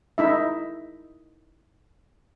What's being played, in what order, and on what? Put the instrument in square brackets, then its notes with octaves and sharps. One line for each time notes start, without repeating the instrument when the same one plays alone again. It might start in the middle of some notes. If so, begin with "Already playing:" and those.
[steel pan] D#4 E4 E5